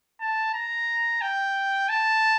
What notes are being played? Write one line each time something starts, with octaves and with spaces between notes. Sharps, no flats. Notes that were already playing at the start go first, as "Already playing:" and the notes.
A5
A#5
G5
A5